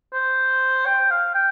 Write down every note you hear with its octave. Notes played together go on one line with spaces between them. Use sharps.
C5
G5
F5
G5